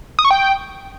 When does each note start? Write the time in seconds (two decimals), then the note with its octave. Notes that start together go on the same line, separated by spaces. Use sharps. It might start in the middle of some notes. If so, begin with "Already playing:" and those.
0.19 D#6
0.25 C#6
0.31 G5